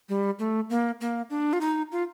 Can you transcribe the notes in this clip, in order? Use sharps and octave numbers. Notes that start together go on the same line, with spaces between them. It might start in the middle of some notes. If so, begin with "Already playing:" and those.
G3
A3
A#3
A#3
D4
F4
D#4
F4